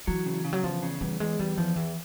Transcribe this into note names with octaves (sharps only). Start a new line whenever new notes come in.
E3 F#3
C#3
C#3
F#3
E2 F3
C#3
E2 G3
E2 G#3
E2 G3
E2 F3
E2 E3